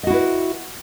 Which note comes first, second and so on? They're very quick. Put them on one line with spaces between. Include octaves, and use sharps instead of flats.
D#5 F#4 E4 B4